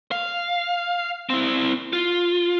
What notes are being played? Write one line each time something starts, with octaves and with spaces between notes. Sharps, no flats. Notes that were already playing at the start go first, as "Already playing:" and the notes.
F5
C4 E4
F4